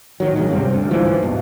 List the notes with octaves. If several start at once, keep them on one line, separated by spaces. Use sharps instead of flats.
A1 D#3 F#3
F1 A#1 G#2 C#3
G2 C3 G3 C4
D2
D2 G#2 E3 F3
G2 B2